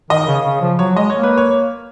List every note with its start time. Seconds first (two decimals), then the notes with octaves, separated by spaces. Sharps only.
0.10 D#3 D#5
0.27 C#3
0.45 C#3
0.62 F3
0.79 F#3 C#5
0.96 G#3 D#5
1.10 A#3 C#5
1.23 B4
1.38 C#5